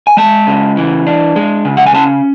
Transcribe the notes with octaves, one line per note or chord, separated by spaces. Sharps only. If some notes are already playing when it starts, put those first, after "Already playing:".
G#5
G#3 A5
C#3
E3
D4
G#3
C#3
F#5
G#5
C#4 A5